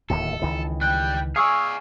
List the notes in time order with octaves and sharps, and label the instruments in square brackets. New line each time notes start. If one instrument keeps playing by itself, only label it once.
[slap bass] D1 D#2 A2 [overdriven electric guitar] A4
[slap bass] C#2 D#3 E3
[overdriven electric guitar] G3 G5 [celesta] F#6
[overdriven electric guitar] G#4 D5 [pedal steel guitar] F5 G#5 C#6 [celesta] D#6 E6